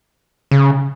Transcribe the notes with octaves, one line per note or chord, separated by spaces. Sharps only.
C#3